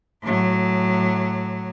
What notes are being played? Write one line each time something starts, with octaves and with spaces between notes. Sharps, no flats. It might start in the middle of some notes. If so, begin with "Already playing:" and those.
A2 F#3